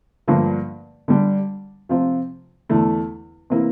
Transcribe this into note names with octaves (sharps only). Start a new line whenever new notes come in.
G2 D3 F3 A#3
D3 G3 D4
C3 F3 C4 F4
E2 D3 A3 E4
C3 E3 A#3 E4